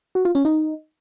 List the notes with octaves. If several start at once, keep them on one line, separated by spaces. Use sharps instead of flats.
F#4
F4
C#4
D#4